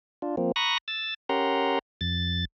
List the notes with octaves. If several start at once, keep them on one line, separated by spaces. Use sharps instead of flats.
D4 F4
F3 A#3 C4
A#5 B5 C#6 D#6 F#6 A#6
E6 A6
C#4 G4 A#4 F#5 A#5 C6
F2 A6